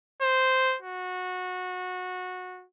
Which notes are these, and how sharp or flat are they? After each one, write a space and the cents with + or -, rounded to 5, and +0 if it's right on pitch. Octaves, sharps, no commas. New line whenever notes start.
C5 -5
F#4 -20